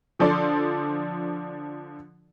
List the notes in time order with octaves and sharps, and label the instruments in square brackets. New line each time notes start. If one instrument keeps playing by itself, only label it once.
[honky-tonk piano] D3 F3 A4 D5 C6